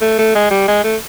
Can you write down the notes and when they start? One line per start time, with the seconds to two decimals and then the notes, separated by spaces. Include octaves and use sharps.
0.01 A3
0.19 A3
0.35 G#3
0.50 G3
0.68 G#3
0.84 A3